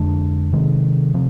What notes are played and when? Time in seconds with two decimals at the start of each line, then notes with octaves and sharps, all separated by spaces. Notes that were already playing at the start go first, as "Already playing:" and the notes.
Already playing: F2 D3 G#3 D4
0.53 C3 D#3 G#3
1.14 C3 F3